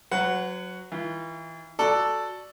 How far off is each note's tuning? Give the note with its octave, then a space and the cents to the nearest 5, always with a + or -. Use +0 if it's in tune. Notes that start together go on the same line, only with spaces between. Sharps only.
F#3 -5 B4 +45 F#5 +0
E3 -30 F4 -45
F#4 +0 A4 +0 D5 +0